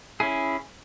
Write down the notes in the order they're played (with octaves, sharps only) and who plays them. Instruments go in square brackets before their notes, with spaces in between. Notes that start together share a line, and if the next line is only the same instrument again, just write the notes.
[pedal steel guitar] C#4 E4 G#4